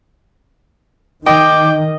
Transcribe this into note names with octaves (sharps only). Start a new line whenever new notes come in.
D#3 D#5 G5 D6